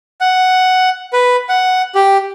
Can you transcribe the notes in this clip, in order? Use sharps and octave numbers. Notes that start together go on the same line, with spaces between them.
F#5
B4
F#5
G4